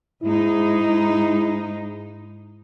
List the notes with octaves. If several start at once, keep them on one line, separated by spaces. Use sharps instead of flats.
G#2 G#3 D#4 E4